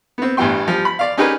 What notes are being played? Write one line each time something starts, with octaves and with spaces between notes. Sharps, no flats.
B3 C4
A1 G2 E3 G3 G5 C6
F3 G3
B5
D5 F5
C#4 D#4 G4 G#4 A#4 B4